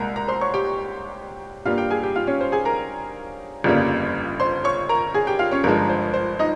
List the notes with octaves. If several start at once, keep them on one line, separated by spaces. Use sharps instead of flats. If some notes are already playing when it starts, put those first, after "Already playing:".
Already playing: C2 A#2 G#3 A#4 A#5
A#4 A#5
C5 C6
C#5 C#6
G4 G5
G2 G3 A#3 F4 F5
G4 G5
G#4 G#5
G4 G5
F4 F5
C#4 C#5
C5
G#4 G#5
A#4 A#5
G1 F2 C#3 G3 A#3
C5 C6
C#5 C#6
A#4 A#5
G#4 G#5
G4 G5
F4 F5
C#4 C#5
G1 G2 F3 G#3 A#4
C5
C5
D#4 D#5